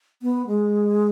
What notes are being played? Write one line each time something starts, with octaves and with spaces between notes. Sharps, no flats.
B3
G#3